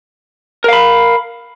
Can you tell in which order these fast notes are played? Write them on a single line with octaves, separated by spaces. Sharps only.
A#4 F5 B5